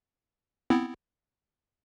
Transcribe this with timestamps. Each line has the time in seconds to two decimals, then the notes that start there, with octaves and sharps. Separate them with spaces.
0.70 B3 C4 E4